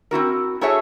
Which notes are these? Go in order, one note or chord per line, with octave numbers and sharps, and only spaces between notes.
C4 E4 F#4 A#4
E4 F#4 G#4 A4 C#5 E5